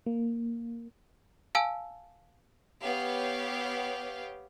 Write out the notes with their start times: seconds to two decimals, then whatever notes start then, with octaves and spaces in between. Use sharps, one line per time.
0.06 A#3
1.55 F5 G#5 A5 E6
2.83 B3 G4 C#5 F5